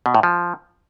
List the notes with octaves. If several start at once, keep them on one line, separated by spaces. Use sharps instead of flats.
B2
A2
F3